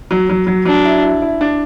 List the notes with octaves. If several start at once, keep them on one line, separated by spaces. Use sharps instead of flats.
F#3
F#3
F#3
F#3 D4
E4
E4
E4
D4